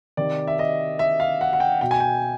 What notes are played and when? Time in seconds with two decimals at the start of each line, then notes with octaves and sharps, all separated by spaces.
0.17 C3 D#3 D5
0.47 E5
0.59 D#5
0.99 E5
1.20 F5
1.41 F#5
1.53 F#5
1.60 G5
1.81 B2 G5
1.91 G#5
2.00 G5